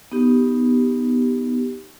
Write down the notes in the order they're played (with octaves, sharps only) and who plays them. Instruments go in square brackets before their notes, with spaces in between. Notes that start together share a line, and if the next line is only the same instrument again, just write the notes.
[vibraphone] B3 D#4 G4